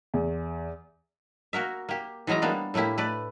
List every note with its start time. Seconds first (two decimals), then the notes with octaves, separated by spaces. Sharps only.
0.14 E2
1.53 A#3 F#4 A#4 E5
1.89 A#3 G4
2.27 E3 F#3 G#3 C#4 A#5
2.42 G3 A#3 B3 D4 D5
2.74 A2 A3 A#3 E4 G4
2.98 A3 B4 D5